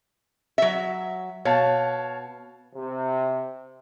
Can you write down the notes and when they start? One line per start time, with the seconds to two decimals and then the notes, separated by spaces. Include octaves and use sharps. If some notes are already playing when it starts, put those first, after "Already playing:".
0.58 F#3 E5
1.45 B2 C#5 F5 A5
2.76 C3